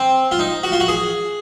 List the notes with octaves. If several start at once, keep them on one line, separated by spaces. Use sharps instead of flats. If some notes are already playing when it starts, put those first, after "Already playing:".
Already playing: C4
F4
D#4
F#4
F4
F#4
G#4